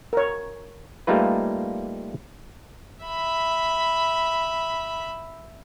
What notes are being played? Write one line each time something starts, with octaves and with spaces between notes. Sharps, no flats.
A#4 C#5
G3 A3 A#3 D#4 F4 B4
E5 B5